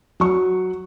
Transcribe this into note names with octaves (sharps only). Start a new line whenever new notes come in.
F#3 C#6